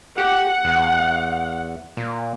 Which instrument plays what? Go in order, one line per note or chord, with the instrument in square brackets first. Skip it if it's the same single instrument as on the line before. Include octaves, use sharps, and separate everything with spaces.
[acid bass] G4 [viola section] F#5
[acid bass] E2
A#2